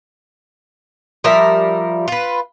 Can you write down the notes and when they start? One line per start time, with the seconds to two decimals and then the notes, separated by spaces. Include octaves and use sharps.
1.24 F3 G3 A#4 E5
2.08 F4 B4